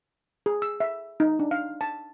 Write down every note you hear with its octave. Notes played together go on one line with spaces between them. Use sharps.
G#4
E6
E5
D#4
D4
F5
A5